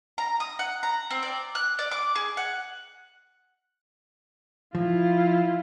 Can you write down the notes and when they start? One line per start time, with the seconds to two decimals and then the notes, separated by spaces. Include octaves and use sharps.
0.18 A#5
0.40 D#6
0.59 F#5
0.83 A#5
1.10 C4
1.23 D5
1.55 F#6
1.79 D5
1.91 D6
2.15 G#4
2.37 F#5
4.75 F3 E4 F4